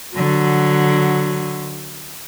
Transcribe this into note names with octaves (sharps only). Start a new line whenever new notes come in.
D3 F#3